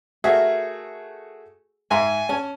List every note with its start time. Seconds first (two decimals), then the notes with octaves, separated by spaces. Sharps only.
0.24 A3 F#4 G#4 A#4 E5
1.91 G#2 E5 G5 G#5 A#5 C6
2.29 C#4 A5